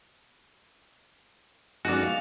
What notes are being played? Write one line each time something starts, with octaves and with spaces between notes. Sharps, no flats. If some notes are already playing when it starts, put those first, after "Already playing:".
G#3 C#4 D#4 F#4 G#4 D5
F5